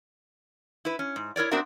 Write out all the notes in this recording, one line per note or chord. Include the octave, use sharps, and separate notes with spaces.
E4 B4
C#4
G#2
E4 A#4 C#5 D5
B3 C4 D4 F#4 A#4 E5